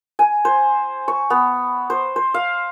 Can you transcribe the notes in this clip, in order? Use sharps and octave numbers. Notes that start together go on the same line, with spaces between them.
G#5
C5
C#6
B3
C5
C5
F5